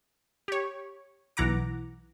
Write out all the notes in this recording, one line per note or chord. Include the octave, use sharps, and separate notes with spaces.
G4 C#5
B1 E3 F#5 A#5 D6